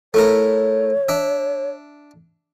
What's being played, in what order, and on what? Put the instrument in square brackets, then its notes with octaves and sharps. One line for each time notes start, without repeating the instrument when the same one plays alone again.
[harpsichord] A3 E4 A#4 [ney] C#5
[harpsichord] D4 E5